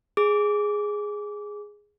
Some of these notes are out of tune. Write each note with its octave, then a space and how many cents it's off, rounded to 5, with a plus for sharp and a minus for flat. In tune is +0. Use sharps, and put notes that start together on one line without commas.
G#4 +0 D6 -20